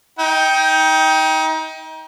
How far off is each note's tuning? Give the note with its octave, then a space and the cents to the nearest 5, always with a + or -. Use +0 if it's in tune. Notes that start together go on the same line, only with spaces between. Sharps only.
D#4 +30 G5 +0